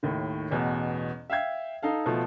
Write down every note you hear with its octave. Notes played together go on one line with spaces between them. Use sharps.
D#2 A2 D#3
A1 E2 B2
E5 F5 G5 G#6
D#4 A4 F5
B2 F3 A3